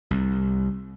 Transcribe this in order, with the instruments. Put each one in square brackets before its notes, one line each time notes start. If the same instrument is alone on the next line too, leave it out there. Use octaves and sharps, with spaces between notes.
[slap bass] C2